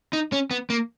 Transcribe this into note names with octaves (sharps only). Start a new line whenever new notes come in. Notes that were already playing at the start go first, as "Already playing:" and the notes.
D#4
C#4
B3
A#3